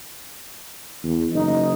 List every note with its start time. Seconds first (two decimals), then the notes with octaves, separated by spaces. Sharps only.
1.04 E2
1.33 F#1 D#4